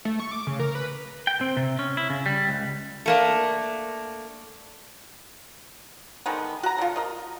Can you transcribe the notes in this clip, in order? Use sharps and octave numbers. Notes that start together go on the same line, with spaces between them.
A3
C#6
D6
C#3
A#4
B4
G5
C4
C3
C#4
E4
C#3
G3
C#2
A3 A#3 D4
D3 D#3 G#3 B3
F#4 A#5
D3 F4
A#4 D#5